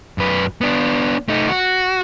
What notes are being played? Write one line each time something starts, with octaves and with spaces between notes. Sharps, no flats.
F#2 B4
B3 D4
A3 D#4
F#4